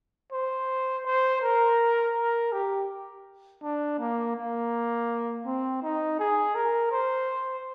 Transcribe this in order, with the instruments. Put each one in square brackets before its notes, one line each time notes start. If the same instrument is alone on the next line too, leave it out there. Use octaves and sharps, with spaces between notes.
[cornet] C5
C5
A#4
A#4
G4
D4
A#3
A#3
C4
D#4
G#4
A#4
C5